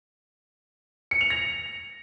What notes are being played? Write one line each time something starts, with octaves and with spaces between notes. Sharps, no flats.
C#7
F7
A#6